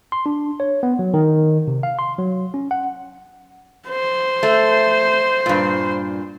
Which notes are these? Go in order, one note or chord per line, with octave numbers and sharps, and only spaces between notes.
C6
D4
C#5
B3
F#3
D#3
C3
F5
C6
F#3
C#4
F#5
C5
A3
G2 A#2